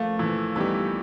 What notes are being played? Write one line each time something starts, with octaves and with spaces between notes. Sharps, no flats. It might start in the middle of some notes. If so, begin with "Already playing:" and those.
Already playing: F3 A3 A#3
A#2 E3
E3 G3 B3 D#4 G4